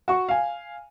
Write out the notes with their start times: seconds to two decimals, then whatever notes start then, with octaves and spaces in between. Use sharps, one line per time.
0.08 F#4 C#6
0.29 F5 G#5